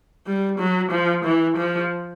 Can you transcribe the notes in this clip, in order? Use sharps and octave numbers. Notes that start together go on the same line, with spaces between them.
G3
F#3
F3
E3
F3